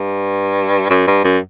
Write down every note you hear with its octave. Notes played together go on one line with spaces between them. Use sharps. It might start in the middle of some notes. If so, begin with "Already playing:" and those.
Already playing: G2
F#2
G2
F#2